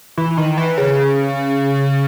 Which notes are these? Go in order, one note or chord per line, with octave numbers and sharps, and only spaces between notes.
E3
D#3
E3
C#3